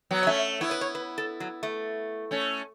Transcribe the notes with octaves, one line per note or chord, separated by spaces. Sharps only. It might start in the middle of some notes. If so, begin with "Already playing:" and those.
F#3 B3
C#5
A3 C#4 E5
B3 E4 C#5
B4
C#5
B4
A4
F#3
A3
A3 C#4